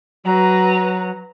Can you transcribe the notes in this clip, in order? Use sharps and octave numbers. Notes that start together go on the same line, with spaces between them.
F#3 B4 A#5